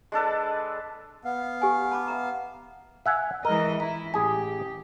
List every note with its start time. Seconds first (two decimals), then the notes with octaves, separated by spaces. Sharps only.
0.12 G#3 D4 A4 B4
1.25 B3 F5
1.61 G4 G#5
1.92 A5 B5 D6
2.08 E5 A#5
3.06 E5 F#5 G#5
3.45 E3 G#3 A#4 D#5
3.80 E4 A#5
4.14 A1 G4 G#4 G#5